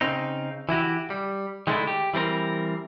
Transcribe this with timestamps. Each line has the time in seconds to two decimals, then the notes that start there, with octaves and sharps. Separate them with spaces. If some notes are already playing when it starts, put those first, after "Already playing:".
0.01 C#3 C4 D#4
0.69 E3 E4 F#4 G4
1.10 G3
1.67 D#3 G#3 A3 C#4 D4 E4
1.87 G4
2.14 E3 G3 C4 A#4